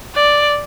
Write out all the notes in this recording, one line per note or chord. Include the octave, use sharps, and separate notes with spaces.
D5